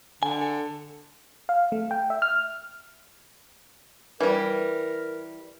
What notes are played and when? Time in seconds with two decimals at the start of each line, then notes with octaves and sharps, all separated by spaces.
0.23 D3 G#5
0.41 A4
1.49 F5
1.72 A3
1.91 G5
2.10 E5
2.22 F6
4.21 E3 G3 A#4